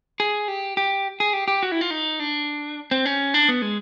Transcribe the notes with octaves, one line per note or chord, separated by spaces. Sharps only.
G#4
G4
G4
G#4
G4
G4
F#4
E4
F4
D#4
D4
C4
C#4
D4
B3
G#3